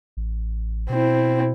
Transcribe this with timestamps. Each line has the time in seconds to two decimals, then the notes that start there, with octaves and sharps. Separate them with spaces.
0.17 A1
0.89 B2 C4 E4